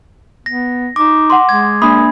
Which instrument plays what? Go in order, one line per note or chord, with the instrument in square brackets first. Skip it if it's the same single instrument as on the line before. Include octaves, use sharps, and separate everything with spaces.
[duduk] B3 [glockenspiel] A#6
[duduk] D#4 [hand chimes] D6
[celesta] F#5 C6
[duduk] G#3 [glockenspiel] G#6
[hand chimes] A#3 D4 [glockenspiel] B5 [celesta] D#6